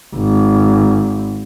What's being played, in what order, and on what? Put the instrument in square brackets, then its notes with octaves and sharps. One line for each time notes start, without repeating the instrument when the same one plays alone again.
[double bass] G#1